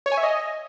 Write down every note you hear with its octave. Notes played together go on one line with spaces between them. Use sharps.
C#5
G#5
E5
D#5